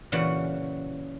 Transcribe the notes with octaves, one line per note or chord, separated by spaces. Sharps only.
A#2 C#3 E3 F#4 F#5